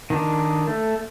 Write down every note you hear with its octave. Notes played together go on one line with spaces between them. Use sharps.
D#3 D4
A3